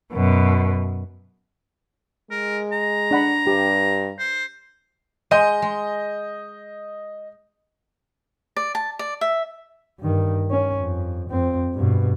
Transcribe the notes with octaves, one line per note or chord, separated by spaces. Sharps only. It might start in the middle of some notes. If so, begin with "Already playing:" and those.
F#2 B2
G#3 A#4
A#5
D4 F#5 B5
G2 G4
C5
G#3 D#5 G6 D#7
G#3
D5
A5
D5
E5
G2 D#3
C#4
F2
F2 C4
G2 B2